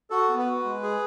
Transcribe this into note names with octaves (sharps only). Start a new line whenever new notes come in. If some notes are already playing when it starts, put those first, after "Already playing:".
F#4 A4
B3
B4
F#4
G#3
G#4